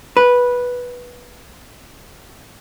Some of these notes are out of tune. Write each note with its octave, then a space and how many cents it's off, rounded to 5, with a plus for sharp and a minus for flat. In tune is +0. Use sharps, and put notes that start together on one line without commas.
B4 -10